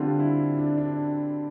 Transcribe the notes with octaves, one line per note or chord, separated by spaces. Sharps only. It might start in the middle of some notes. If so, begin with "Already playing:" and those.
Already playing: D3 G3 C4 D4 F4
E4
D4
D4